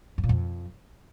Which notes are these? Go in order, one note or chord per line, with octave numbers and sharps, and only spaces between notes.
G#2
A#2
F2